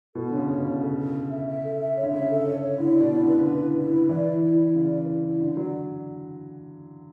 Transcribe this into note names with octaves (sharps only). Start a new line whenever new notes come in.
B2 A4
D3 C#5
C#3
C#3 C#5
B2
A4
C#3 A4
A4
A4
E5
E5
A4
E5
C#5
D3
C#3 E5
A4
C#5
C#5
D3 E4
D5
B2
E4
D3
C#3
B4
D3 B4
E4
E4
B4
E3 D5
E4
E4
E4
C#3 D5
B4
E4
E4
D3 D5
F#3 D5